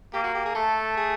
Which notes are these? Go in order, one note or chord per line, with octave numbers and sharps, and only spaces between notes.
A#3 G4
F#4
G4
G#4
A3 A4
G#4